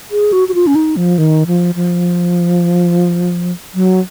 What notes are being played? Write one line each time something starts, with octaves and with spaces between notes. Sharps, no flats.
G#4
F#4
F#4
F4
C#4
D#4
F3
D#3
F3
F3
F#3